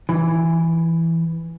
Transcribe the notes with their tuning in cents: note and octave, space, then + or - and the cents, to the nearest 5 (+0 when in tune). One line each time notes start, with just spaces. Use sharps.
E3 +5